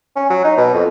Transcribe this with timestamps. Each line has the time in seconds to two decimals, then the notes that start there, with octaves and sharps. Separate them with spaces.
0.16 C#4
0.30 F#3
0.44 D#4
0.57 B2
0.74 F2